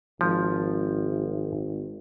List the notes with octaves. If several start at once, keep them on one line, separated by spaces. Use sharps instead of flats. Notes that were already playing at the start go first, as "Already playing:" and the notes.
G#1 F3